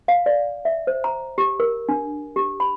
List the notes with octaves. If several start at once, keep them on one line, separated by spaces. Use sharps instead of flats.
F5
D5
E5
C5
A#5
G4
A#4
D4
G4
B5